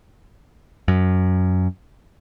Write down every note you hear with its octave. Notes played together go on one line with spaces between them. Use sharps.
F#2